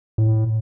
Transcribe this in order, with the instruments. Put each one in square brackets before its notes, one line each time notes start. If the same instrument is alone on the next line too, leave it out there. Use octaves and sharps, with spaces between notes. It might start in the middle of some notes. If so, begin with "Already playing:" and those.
[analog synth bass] A2